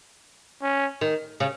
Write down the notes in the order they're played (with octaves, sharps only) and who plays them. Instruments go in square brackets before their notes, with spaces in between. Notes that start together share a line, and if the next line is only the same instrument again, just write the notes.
[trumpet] C#4
[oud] D#3
C#3